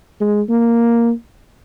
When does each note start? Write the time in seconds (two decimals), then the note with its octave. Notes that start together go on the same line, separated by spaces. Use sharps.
0.20 G#3
0.49 A#3